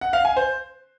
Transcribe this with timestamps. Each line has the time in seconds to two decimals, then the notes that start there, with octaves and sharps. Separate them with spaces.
0.01 F#5
0.13 F5
0.25 G#5
0.36 C5